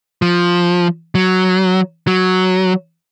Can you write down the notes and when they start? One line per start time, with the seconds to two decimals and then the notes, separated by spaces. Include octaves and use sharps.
0.22 F3
1.15 F#3
2.07 F#3